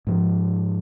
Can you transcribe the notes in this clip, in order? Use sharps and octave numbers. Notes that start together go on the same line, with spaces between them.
G#2 F3